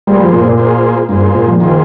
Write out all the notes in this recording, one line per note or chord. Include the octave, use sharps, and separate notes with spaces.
G3 A#3 F4 G#4 C5
F3
A#2
A#2
A#3 F4 G#4 C5
G2 A#3 F4 G#4 C5
A#2
F3
D#3 A#3 F4 G#4 C5